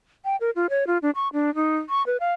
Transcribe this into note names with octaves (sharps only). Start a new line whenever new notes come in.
G5
A#4
F4
C#5
F4
D4
C#6
D4
D#4
C#6
B4
F5